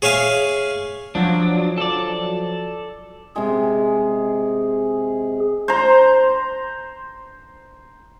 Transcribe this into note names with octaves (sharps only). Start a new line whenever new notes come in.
G#4 C#5 E5 F5 G#5
F3 F#3 D4
A4 D5
C3 G#3 G#4
C5 A#5